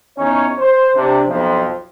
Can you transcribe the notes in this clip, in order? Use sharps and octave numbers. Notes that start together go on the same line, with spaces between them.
E2 C#4 D#4 C#5
C5
C3 D4
B1 F2 F3